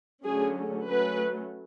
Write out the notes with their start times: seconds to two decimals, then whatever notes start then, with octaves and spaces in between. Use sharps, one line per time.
0.24 D3 F#3 A3 C#4 G#4
0.86 F#3 A3 C#4 B4